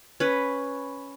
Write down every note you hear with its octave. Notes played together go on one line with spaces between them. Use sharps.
C#4 B4